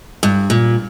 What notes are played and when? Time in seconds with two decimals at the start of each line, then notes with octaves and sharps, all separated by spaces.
0.23 G2
0.50 A#2